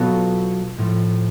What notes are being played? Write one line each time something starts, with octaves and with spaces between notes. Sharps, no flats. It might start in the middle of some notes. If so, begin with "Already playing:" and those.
Already playing: B2 F#3 B3 F4 A4
A2 F3 A3